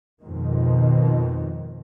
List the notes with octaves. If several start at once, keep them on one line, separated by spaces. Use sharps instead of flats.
F2 G#2 B2 D#3